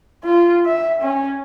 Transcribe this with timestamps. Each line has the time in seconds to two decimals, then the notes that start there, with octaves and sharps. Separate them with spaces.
0.24 F4
0.65 E5
1.01 C#4